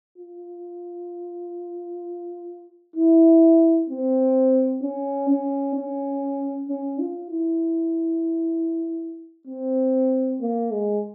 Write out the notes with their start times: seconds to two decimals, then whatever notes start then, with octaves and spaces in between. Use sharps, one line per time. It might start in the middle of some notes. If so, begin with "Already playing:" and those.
0.18 F4
2.96 E4
3.90 C4
4.82 C#4
5.29 C#4
5.76 C#4
6.69 C#4
6.99 F4
7.31 E4
9.47 C4
10.41 A#3
10.72 G#3